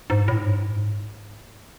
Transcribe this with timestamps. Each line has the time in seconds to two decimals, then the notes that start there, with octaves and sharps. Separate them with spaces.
0.10 G#2
0.28 A2
0.37 G#2
0.46 G2
0.56 G#2